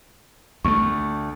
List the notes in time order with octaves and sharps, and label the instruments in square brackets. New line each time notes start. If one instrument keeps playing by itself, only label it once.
[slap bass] D2 G#3 A3 [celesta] C#6